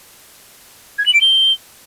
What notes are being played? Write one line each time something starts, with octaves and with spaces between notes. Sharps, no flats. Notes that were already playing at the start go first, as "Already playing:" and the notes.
G#6
F#7
D7
G7